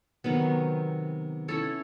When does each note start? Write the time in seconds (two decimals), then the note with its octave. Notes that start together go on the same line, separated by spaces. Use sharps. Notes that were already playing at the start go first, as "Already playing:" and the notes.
0.24 C3 D#3 F#3 B3
1.48 C#4 E4 A4 C#5